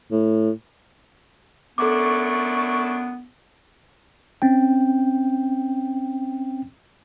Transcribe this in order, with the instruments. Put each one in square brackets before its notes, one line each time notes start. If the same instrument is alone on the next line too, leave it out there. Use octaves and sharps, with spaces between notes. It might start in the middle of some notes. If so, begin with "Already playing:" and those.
[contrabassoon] A2
[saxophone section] F#2 A3 D4 [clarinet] B3 [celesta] A4 D6 [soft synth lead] C#6
[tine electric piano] C4 C#4 G5